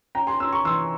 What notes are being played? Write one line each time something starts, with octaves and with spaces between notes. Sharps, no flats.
C#4 G5 A#5
G#5 C6
C#4 C6 E6
A#5 C#6
E3 C6 E6